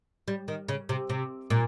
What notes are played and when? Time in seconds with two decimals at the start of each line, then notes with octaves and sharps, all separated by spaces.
0.28 G3
0.48 D#3
0.68 C#3
0.89 C3
1.09 C3
1.50 A#2